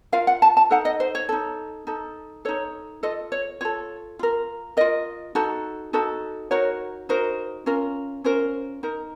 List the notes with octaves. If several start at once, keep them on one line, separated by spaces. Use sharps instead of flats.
F4 A#4 F5
F#5
A5
A5
D#4 A4 F#5
D#5
C5
C#5
D#4 A4
D#4 A4
D#4 A4 C#5
F4 A4 D#5
C#5
F4 A4 C#5
F4 A#4
F4 A#4 D#5
D#4 F#4 A4
D#4 F#4 A4
D#4 F#4 A#4 C#5
D#4 F#4 A#4 C5
C#4 F4 A#4
C#4 F4 A#4 C5
D#4 A#4